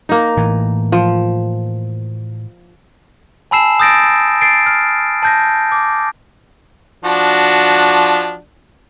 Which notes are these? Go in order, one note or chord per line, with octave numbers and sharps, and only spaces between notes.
A#3 D#4
A2 E3
F3
G#5 A5 B5 E6 C7 E7
D#6 E6 G6 A6 A#6 D7
A6 C7 D7
F6
A5 G6 A#6
D6
F3 D4 F#4